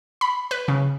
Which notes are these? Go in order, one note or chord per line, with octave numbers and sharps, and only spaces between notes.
B5
B4
C#3